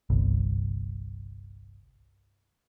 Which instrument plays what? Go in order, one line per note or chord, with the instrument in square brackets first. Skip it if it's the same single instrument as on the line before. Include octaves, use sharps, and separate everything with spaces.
[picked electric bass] G1 C2